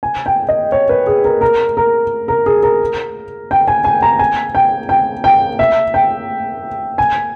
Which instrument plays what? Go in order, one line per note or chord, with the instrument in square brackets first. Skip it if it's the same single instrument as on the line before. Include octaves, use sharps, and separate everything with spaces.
[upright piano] G#5
G5
D#5
C#5
B4
G#4
A#4
A#4
A#4
A#4
G#4
A#4
G5
G#5
G#5
A#5
G#5
G5
G5
G5
E5
G5
G#5